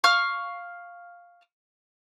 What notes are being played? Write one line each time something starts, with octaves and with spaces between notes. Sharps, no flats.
F5 C#6 F6